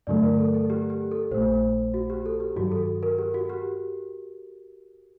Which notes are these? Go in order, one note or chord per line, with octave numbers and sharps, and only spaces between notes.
G2 D3 F#3 A3 D5
A#4
A4
A4
G4
G4
A4
A#1 A#2 A3 C5
F#4
G4
A4
G4
G2 D#3 F#3 F#4
A4
A#4
G4
F#4
G4